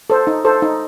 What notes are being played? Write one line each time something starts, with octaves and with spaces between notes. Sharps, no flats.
A4 C5
D#4
A4 C5
D#4